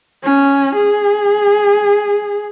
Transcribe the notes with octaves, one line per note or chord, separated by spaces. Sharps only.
C#4
G#4